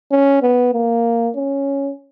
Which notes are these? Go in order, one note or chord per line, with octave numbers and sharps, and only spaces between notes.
C#4
B3
A#3
C#4